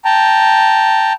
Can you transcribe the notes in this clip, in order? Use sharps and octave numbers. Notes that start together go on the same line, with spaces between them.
G5 A5 A#5